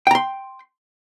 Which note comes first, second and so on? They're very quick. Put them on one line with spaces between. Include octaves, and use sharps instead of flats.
G5 A#5 C6